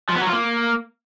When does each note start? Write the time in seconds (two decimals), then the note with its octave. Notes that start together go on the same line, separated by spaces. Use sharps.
0.09 F3
0.15 B3
0.21 F#3
0.27 F4
0.33 A#3